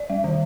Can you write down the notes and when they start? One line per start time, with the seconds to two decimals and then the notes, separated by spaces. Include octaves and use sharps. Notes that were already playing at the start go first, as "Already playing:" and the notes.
Already playing: D5
0.10 G3
0.24 D#3